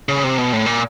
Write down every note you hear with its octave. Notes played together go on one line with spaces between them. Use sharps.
C#3
C3
B2
A2
A#2